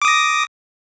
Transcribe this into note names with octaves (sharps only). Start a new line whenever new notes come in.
D6 D#6 A#6